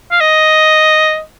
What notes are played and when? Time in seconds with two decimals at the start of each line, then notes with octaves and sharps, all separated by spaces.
0.11 F5
0.20 D#5